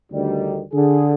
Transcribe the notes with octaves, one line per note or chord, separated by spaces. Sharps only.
D2 D#3 G3
D3 G#4